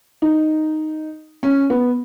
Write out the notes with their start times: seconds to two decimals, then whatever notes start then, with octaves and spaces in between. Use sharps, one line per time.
0.22 D#4
1.43 C#4
1.70 B3